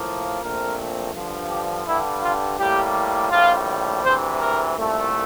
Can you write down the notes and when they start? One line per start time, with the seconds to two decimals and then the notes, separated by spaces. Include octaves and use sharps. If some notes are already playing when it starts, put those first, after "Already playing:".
Already playing: A2 F3 A#3
0.41 A#1 A#2 A3 C4 A#4
1.13 G2 D3 F3
1.50 G4
1.86 G2 D3 G3 E4
2.21 F4
2.58 A2 G3 A#3 G4
3.30 A#1 A2 G3 F4
4.03 D2 C3 E3 C5
4.39 A#4
4.76 C2 A#2 A3